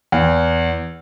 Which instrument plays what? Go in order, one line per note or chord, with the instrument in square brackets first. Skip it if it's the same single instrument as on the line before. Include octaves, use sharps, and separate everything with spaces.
[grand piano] E2